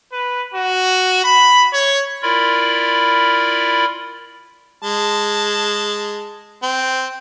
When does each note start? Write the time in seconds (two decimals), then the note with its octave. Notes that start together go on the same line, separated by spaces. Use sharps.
0.12 B4
0.54 F#4
1.24 B5
1.73 C#5
2.23 E4 F4 A#4 D5 B5
4.83 G#3 A5
6.62 C4